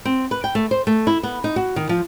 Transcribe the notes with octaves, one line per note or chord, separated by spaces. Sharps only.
C4
B4
G5
A3
C5
A3
E4
B3
D#4
F#4
D#3
F3